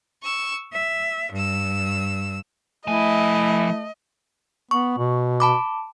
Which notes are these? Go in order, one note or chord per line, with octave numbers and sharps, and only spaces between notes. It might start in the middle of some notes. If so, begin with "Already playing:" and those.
C#6 E6
E5
G2 E6
F3 A3 E4 D#5 G#5
B3 C#6
B2
A5 B5 D6